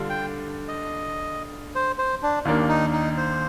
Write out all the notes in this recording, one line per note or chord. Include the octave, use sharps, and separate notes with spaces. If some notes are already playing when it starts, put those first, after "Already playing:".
Already playing: D3 G3 D4 F4
G5
D#5
C5
C5
D4
D#2 D#3 A#3 D4
D#4
D#4
C5